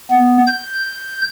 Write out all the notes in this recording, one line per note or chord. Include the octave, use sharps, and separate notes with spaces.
B3
G6